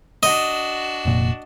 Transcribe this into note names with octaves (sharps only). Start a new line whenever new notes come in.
D4 F#4 D#5
F1 A#2